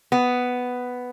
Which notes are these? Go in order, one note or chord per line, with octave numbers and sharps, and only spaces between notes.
B3